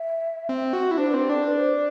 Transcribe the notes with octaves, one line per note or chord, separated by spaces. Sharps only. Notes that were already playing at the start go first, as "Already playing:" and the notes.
Already playing: E5
C4
F#4
E4
D4 C5
B4
C4
G4
D4 A4
B4
C5